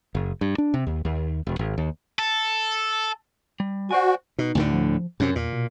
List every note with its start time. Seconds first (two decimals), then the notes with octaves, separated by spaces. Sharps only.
0.15 F#1
0.41 G2
0.58 D4
0.74 C3
0.87 D#2
1.05 D#2
1.47 E1
1.59 G#1
1.78 D#2
2.19 A4
3.60 G3
3.91 F#4 C5 D5 G#5
4.39 B2 D#4
4.55 D2 A2 D3
4.73 F3
5.20 F#2 C3 C#4
5.35 E2 A#2
5.53 B2